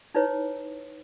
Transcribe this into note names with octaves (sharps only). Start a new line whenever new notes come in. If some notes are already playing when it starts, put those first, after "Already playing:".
D#4 E4 B4 C#5